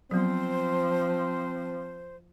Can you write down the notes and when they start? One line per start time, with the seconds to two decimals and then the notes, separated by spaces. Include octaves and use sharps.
0.11 F3 F#3 B3 C4 C5